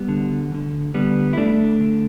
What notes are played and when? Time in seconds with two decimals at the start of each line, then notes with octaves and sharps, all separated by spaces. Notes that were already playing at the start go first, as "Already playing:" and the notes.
Already playing: G3 B3
0.08 D2 D3
0.51 D2 D3
0.94 D2 D3 G3 B3
1.33 E4
1.37 D2 D3 A3 D4
1.81 D3